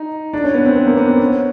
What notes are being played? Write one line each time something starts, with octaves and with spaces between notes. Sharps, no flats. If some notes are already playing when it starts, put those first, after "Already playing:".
Already playing: D#4
D4
C#4
B3
C4
B3
A#3
B3
C4
C#4